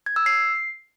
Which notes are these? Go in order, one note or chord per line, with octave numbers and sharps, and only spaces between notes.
G#6
E6
C7